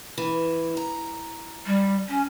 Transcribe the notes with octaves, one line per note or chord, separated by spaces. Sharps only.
E3
A#5
G3
C#4